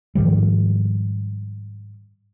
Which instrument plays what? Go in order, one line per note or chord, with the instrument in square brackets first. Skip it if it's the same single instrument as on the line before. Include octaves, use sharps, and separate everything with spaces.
[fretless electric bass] G#2 D#3 F3 G3